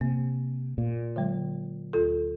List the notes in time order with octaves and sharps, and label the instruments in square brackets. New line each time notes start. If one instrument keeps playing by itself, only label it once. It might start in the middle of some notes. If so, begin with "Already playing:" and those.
[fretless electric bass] C3 [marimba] A#3
[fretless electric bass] A#2
[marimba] D3 F#3 G#3
D2 F4 A4